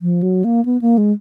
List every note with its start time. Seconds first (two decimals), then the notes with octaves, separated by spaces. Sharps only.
0.02 F3
0.23 F#3
0.44 A#3
0.65 B3
0.82 A#3
0.98 G#3